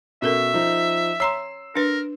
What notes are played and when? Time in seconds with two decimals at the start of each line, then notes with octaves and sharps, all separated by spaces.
0.22 B2 C#4 A4 A#4 E5
0.54 F3 D#4
1.20 C#5 A#5 C6 E6 C7 E7
1.76 D4 A#4 B4